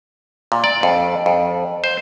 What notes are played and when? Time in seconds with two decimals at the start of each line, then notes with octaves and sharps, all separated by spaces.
0.52 A#2
0.64 D5
0.83 F2
1.26 F2
1.84 C5